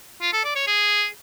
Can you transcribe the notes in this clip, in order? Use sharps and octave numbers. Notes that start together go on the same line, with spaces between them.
F4
A4
D5
C#5
G#4